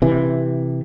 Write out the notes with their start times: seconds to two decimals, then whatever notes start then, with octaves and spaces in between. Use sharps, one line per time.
0.02 C3 E3